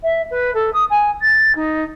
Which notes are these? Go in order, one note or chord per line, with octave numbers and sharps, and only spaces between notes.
E5
B4
A4
D#6
G#5
A6
D#4